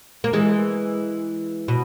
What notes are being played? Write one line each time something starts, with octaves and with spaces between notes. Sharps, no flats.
A#3
E3 G#3
B2